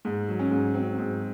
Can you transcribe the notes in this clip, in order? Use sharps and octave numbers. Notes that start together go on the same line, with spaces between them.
G#2
F#3
C#4
G#2
F#3 C4
G#2